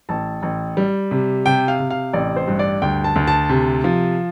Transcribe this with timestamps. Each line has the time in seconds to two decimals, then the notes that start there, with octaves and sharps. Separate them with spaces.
0.09 A1 A5
0.43 A1
0.77 G3
1.11 C3
1.46 C3 G5
1.68 F5
1.79 C3
1.91 F5
2.13 A1 D5
2.36 C5
2.48 G2
2.59 D5
2.82 D2 G5
3.04 A5
3.16 D2
3.28 A5
3.49 C3
3.84 F3